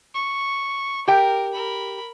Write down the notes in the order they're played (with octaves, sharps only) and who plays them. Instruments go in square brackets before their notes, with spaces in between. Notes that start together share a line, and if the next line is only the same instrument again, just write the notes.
[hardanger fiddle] C#6
[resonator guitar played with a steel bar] G4 G5 [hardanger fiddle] A#4
[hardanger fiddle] A#4 B5